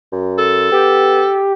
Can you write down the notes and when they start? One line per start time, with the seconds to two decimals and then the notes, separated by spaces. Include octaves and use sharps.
0.12 F#2
0.38 A4
0.72 B3 G4